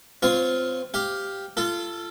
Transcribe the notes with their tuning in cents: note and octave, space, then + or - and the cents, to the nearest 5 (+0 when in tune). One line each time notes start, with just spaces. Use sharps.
C4 -20 F4 +0 C#5 -10
G4 +0 F5 +0
F4 -25 A4 +5